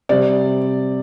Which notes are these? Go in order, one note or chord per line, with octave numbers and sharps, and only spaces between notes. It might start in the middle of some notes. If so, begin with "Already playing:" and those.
C3 G3 D5